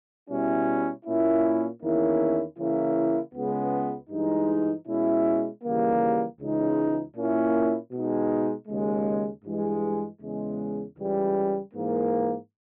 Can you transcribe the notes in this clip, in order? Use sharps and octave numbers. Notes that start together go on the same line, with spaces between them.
B2 G3 C#4 E4
A#2 A#3 C#4 E4
E2 D#3 A#3 C#4 E4
C#3 E3 A#3 C#4 E4
C#2 C#3 G#3 B3
G2 E3 G#3 D#4
B2 G#3 C#4 E4
D#2 C#3 E3 G3 A#3
C#2 C#3 E3 G#3 D#4
A#2 A#3 C#4 E4
B2 G#3 D#4
D#2 C#3 G#3
G2 E3 G#3
E2 C#3 G#3
C#2 C#3 E3 G3
G#2 E3 A#3